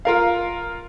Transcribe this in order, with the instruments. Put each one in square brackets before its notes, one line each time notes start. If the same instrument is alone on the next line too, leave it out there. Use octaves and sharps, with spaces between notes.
[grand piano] F4 A#4 F5